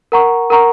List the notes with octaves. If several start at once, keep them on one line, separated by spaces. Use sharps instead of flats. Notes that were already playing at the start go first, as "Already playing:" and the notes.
A#4 F#5 A#5 C#6
A#4 F#5 A#5 C#6